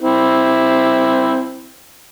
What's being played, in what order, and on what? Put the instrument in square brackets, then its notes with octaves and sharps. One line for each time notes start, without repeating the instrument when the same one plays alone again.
[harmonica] C4 E4